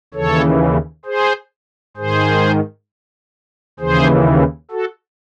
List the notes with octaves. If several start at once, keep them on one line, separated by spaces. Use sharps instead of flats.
D#2 C#3 E3 A4 C#5
G#4 C5
G#2 D#3 G#4 C5
D#2 C#3 E3 G#4 C5
F#4 A4